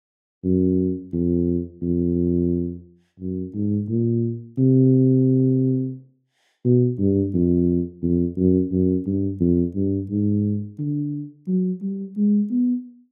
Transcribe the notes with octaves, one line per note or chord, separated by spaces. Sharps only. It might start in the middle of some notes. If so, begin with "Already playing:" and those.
F#2
F2
F2
F#2
G#2
A#2
C3
B2
G2
F2
F2
F#2
F#2
G2
F2
G2
G#2
D3
F#3
G3
G#3
B3